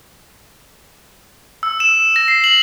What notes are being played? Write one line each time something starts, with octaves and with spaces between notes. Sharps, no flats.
E6
E7
A#6
C7
F#7